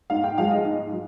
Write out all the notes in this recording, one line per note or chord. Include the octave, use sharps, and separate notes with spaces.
G#2 F5
G5
F3 G#3 F5
D#5
G#2
F3